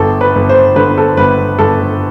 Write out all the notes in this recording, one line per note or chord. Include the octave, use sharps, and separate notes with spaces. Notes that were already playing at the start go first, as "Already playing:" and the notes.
Already playing: G1 A4
B4
G1
C5
D3 B4
A4
G1 B4
G1 A4